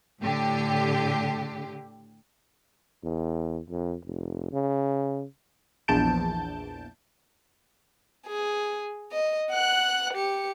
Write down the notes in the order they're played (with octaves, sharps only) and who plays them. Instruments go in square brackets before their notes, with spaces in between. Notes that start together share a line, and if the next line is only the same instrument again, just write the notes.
[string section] A2 D3 G4
[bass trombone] E2
F2
F1
C#3
[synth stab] A#1 E2 A5 G6 D7
[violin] G#4
D#5
F#5 F#6
G4 C#7